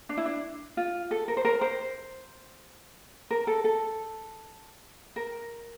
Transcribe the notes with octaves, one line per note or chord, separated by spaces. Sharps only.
D4
E4
D4
F4
A4
A#4
C5
A#4
C5
A#4
A4
A4
A#4